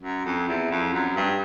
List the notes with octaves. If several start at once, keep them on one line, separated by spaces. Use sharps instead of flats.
F#2
F2
E2
F2
F#2
G2